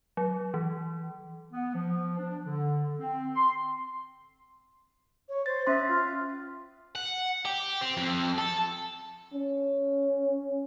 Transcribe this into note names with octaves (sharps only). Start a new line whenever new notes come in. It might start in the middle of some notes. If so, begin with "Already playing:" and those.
F#3
E3
B3
F3
D4
D3
C4
C6
C#5
C5 A6
C#4 E5 C6
F4
F#5
G4
C4
F2
A4
C#4